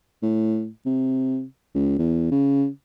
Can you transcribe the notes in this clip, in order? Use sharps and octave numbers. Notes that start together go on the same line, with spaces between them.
A2
C3
C#2
E2
C#3